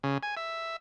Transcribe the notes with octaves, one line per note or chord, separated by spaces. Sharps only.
C#3
G#5
E5